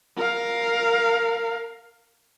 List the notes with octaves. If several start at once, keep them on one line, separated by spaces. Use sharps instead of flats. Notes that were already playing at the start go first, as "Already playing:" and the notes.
A#4 F5